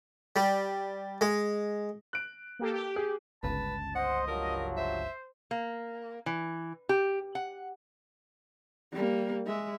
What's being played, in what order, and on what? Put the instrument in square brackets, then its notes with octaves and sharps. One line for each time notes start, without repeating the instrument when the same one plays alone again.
[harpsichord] G3
G#3
[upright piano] F#6 D7
[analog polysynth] A#3 G4 A4
G4
[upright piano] G#4
[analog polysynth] G1 C#2 [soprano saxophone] B4 [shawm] A5
[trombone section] C5 [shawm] D#5 [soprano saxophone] F#5
[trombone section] G2 F3 F#3 [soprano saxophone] A#4
[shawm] C5 [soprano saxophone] E5
[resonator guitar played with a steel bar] A#3
E3
G4
F#5
[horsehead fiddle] G3 A#3
G#3 E5